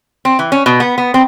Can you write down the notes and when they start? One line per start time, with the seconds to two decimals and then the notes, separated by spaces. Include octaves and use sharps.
0.25 C4
0.39 E3
0.52 C#4
0.66 B2
0.80 B3
0.98 B3
1.14 C4